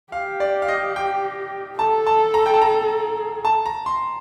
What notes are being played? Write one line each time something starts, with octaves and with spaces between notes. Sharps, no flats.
G4 F5
D5
F5
D#5
G5
A4 A5
A5
A#5
G5
A5
A#5
A5
A#5
C6